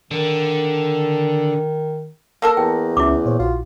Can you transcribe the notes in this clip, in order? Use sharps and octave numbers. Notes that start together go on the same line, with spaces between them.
D3 D#3
A#3 A4 A#4
E2 G5
C#2 C#4 E4 E5 D6
A#2 C5 C#5
A#1 F4 F#4